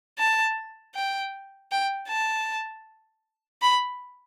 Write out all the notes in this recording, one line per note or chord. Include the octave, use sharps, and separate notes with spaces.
A5
G5
G5
A5
B5